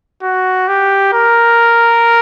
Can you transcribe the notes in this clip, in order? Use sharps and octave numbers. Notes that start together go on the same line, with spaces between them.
F#4
G4
A#4